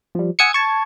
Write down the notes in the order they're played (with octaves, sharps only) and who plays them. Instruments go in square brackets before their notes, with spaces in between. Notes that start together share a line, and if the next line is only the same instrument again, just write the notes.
[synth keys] F3 G3
F#5 G#5 D#6 E6 G#6 C#7
A5 C#6 G#6